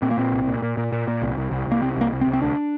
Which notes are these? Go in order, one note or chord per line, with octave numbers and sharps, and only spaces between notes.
A#2 C4
A#3
A#2 C4
C2
A#2
A#2
A#2
A#2
A#2
C2
C2
C2
C2 A#3
C3 C4
C2 A#3
C2
C4
C2
C4
D2 D4